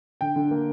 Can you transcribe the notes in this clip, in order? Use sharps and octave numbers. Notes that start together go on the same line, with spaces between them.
D3 G5
D3
A#3